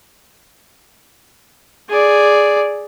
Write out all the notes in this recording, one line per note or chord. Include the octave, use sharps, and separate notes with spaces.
G#4 D5